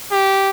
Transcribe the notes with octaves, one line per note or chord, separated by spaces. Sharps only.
G4